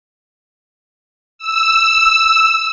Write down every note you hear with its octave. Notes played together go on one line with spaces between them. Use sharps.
E6